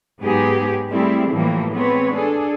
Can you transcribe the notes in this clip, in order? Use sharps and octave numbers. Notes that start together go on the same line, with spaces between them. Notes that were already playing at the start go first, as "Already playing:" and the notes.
G#2 F#3 B3 D#4 G4 G#4
G3 A3 C4 E4 G4 G#4
A2 E3 F3 G3 A#3
G#3 B3 C4 B4 C#5
D4 G#4 A4